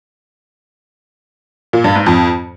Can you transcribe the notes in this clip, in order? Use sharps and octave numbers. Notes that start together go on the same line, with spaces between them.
A#2
G2
G#2
F2